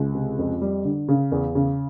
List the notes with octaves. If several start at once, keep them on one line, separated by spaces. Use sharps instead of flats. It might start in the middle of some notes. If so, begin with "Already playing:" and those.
Already playing: C#2
C3
F2
G3
D3
C#3
E2
C#3